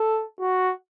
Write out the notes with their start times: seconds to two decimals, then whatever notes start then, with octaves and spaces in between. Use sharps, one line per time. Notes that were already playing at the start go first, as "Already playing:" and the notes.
Already playing: A4
0.40 F#4